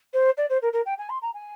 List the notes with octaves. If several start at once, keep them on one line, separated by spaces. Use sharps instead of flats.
C5
D5
C5
A#4
A#4
G5
G#5
C6
A#5
G#5